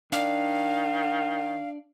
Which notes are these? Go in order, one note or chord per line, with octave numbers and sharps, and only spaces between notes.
D#3 D4 D5 F5